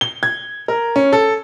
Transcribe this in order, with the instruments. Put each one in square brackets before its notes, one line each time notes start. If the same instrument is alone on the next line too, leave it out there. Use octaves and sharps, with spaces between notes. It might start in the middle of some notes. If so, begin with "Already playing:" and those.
[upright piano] G7
G#6
A#4
C#4
A4